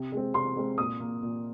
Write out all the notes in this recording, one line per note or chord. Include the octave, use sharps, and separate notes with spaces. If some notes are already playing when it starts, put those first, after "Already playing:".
Already playing: C3
G#3 C4
C3 C6
G#3 C4
A#2 D#6
A#3
A#2